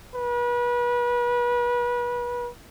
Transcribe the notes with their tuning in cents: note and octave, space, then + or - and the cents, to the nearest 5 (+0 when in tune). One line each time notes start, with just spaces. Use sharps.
B4 -30